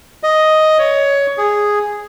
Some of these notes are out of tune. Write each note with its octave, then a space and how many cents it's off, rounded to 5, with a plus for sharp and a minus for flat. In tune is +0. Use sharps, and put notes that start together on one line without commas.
D#5 +5
C#5 +15
G#4 -5